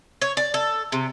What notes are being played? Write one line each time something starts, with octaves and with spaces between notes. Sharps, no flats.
C#5
D5
A4
C3